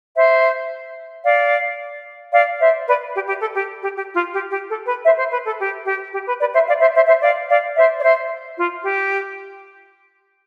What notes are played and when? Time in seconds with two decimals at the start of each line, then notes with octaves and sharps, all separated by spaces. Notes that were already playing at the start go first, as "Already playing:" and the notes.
0.15 C5 E5
1.24 D5 F5
2.33 D5 F5
2.60 C5 E5
2.87 B4 D5
3.15 G4
3.28 G4
3.41 A4
3.55 G4
3.83 G4
3.95 G4
4.14 F4
4.33 G4
4.50 G4
4.69 A4
4.86 B4
5.04 C5 E5
5.18 C5
5.32 B4
5.45 A4
5.59 G4
5.86 G4
6.13 G4
6.27 B4
6.40 B4 D5
6.53 C5 E5
6.67 D5 F5
6.81 C5 E5
6.95 C5 E5
7.08 C5 E5
7.22 D5 F5
7.49 D5 F5
7.76 C5 E5
7.98 D5
8.03 C5 E5
8.58 F4
8.84 G4